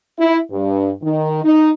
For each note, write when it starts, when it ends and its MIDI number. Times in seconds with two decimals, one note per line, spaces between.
0.18 0.38 64
0.50 0.90 43
1.02 1.39 51
1.43 1.70 63